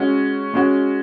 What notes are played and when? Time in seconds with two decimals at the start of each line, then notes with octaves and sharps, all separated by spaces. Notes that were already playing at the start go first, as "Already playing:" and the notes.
Already playing: G#3 C#4 F#4
0.54 G#3 C#4 F#4